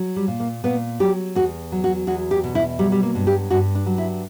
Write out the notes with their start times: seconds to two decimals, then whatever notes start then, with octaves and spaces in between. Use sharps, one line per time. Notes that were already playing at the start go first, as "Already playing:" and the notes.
Already playing: F#3
0.16 G3
0.28 A#2
0.40 A#3
0.64 A#2 B3
1.00 F#3 G4
1.35 E2 F#4
1.72 F#3
1.84 F#4
2.07 E2 F#4
2.31 G4
2.44 B2
2.55 E4
2.79 F#3 G3
2.92 G3
3.03 A#3
3.15 G2
3.27 G4
3.50 G2 F#4
3.75 D4
3.86 F#3
3.98 E4